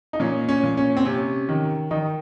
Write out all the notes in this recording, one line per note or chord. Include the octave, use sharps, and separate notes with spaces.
D#4
A#2 C#4
C#4
A#2
C#4
C4
C3 C#4
D#3
D#3 D#4